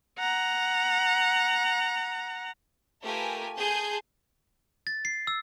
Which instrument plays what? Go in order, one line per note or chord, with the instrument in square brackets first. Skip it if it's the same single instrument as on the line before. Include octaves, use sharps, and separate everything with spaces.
[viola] F#5 A#5
[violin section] A3 F4 G4 A#4 B4 G#5
G#4 G#5 A5 C6 G6
[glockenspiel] A6
C7
E6